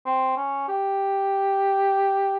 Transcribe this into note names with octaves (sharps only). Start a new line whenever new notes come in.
C4
C#4
G4